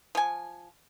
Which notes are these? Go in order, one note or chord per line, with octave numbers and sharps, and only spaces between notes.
F3 G#5